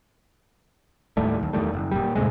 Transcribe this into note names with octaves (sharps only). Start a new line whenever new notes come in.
D#2 A2 G3 A3
D#1 D#2
E2 D#3 G3 A3
F#1
A#2 G3
E2 A2 C3 G#3